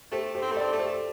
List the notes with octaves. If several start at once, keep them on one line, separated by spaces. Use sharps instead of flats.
A3 G4 C5
G4 C5
C4
A3
C4 A4 D5
A3
G4 C5